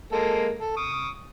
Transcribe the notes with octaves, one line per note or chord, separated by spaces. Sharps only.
G#3 A#3 A4
A4
C#6 D#6